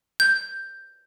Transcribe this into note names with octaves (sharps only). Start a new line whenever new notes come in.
G6